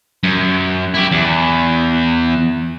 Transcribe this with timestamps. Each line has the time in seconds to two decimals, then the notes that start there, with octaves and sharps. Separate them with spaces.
0.23 F#2
0.94 E4 G4
1.11 E2